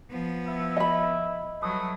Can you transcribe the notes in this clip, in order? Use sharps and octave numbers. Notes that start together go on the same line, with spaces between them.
F3 B3
E4 E5
D#5 B5
F#3 G3 A3 B4 D#6